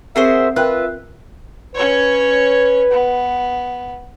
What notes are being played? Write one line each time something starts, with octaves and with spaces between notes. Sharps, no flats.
C4 F#4 G#4 A#4 C5 E5
F4 A#4 B4 E5 G5 F#6
C#4 B4 C#5
B3